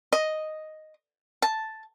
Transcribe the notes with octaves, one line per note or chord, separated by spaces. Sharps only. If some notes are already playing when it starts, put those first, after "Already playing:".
D#5
A5